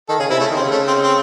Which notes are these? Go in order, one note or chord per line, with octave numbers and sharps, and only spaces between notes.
D#3 A4
C#3 G#4
C3 E4
C#3 A3
D#3
C4
C#3
A3
C4
C4